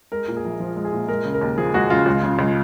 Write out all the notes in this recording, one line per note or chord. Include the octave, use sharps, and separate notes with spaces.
G#3 A#4
A#2
G#4
A#1
F3
G#3
G#4
A#2
G#3 A#4
C#3
A#4
D#2
F3 G#4
G#3 F#4
C#3 F4
C#2
C#3
C#2